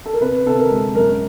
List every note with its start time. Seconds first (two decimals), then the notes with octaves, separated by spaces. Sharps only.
0.06 A4
0.13 A#4
0.21 C3 B4
0.46 C3 A4
0.59 A#4
0.71 G#3
0.95 F#2 A#4